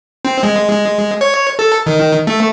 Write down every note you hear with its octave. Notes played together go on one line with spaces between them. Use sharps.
C4
G#3
G#3
C#5
A4
D#3
A3